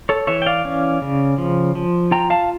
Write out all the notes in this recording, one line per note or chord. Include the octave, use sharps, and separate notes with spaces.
A4 C#5
E3 C#5 E5
G5
D5 F5
C#4
C#3
F3
F3
F4 G5 A#5
F5 A5